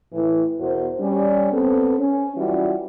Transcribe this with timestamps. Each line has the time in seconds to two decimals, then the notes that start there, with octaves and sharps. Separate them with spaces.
0.13 A2 E3
0.60 E2 B2 F#4 A#4 C5
0.99 G3 C#4
1.52 B3 C4 A4
1.98 C#4
2.35 E3 F#3 G3 C#4 F4 F#4